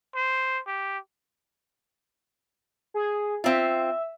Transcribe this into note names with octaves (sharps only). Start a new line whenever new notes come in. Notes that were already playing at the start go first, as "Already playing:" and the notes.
C5
G4
G#4
C4 F4 E5